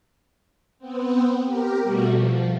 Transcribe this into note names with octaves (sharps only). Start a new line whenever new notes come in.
B3 C4
G4 A#4
B2 G3 A3 F#4
F3